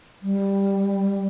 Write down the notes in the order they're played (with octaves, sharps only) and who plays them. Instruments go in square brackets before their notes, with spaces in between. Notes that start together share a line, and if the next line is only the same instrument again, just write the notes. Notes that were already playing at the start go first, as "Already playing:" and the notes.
[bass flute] G3